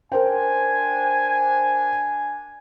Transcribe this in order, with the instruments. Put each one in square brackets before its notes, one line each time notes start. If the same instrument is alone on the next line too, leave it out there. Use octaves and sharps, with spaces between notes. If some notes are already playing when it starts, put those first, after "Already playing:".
[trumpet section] D4 G#5 [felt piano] A#4 C5 G5